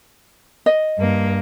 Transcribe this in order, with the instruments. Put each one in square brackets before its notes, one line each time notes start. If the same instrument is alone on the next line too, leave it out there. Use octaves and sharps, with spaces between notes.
[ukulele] D#5
[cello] G2 A#3